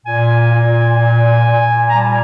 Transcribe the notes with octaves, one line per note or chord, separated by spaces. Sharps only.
A#2 G#5
A#2
A#2
A#2
G3 A#5
A5
G#5